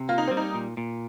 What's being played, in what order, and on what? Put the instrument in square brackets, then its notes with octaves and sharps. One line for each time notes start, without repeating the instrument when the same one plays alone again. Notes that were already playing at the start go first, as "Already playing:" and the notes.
Already playing: [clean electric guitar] C3
[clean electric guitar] A#3 [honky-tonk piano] F4
[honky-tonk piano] D#4
[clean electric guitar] G3 [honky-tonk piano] C4
[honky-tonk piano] D#4
[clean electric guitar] A#2
A#2